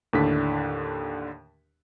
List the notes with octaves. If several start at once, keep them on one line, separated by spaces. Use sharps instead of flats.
D#2 A2 D3 D4 B6